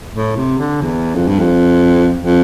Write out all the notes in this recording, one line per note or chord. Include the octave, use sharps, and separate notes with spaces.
A2
C3
D3
E2
F2
G2
F2
F2